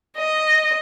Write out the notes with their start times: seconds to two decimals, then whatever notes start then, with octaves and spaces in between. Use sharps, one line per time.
0.17 D#5